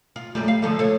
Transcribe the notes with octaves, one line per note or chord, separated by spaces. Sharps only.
F4
F#2 G3 A3
F5
D3 F3 A3
A4 C#5